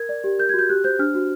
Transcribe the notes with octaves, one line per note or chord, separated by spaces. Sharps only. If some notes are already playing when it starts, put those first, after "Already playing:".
Already playing: A#4 G#6
D5
G4
A#4 G6
F#4 G#6
G6
G4 F#6
C5 G6
D4 F6
F#4